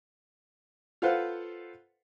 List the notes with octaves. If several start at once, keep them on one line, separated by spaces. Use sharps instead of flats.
F4 A4 B4 C5 F5 F#5